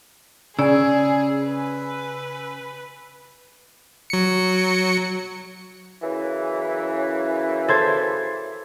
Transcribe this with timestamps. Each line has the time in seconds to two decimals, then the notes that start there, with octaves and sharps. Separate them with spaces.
0.59 C#3 G#4 D5 G#5 E6
1.46 B4
4.10 F#3 C#7
6.02 F#2 C#3 E3
7.68 A4 C5 G#6